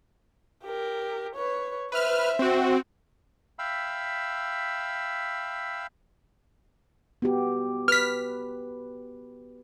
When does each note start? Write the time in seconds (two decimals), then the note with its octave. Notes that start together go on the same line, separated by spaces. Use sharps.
0.64 G4 A#4
1.35 B4 C#5
1.92 B4 C5 E5 F6
2.39 C4 F#4
3.59 E5 F5 G5 B5 E6
7.22 B3 F#4 G4
7.88 B4 F6 B6